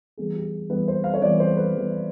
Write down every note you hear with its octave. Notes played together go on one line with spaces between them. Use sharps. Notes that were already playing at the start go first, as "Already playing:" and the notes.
E3 G3 B3 G#4
G4
E3 G3 B3 B4
C5
F5
C#5
E3 G3 B3 D5
C5
B4
E3 G3 B3